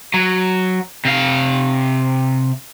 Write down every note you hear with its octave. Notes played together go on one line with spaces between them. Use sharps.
F#3
C3 F5